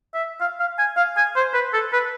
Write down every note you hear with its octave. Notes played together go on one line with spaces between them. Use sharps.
E5
F5
F5
G#5
F5
G#5
C5
B4
A4
B4